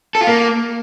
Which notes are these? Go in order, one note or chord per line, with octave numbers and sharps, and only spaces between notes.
A4
F4
A#3